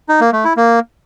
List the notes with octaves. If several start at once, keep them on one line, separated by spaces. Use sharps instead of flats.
D#4
A#3
A3
E4
A#3